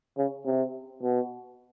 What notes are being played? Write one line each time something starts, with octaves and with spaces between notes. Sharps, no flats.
C#3
C3
B2